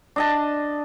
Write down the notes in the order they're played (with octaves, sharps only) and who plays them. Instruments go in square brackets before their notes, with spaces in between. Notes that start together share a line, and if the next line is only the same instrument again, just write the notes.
[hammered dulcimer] D4 D#5 A5